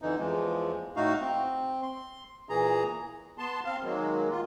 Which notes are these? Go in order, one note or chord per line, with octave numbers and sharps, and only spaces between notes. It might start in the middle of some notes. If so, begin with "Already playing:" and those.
F2 D3 E3 D#4
E2 E3 F3 G#3
A2 A3 D#4 F#4 F5
C4
C6
A#2 E3 G#4 A#5
B3 A5 C6
C4 F5
D#3 F#3 G#3 A#3
F4